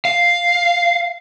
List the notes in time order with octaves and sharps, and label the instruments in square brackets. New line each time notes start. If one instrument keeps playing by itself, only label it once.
[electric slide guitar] F5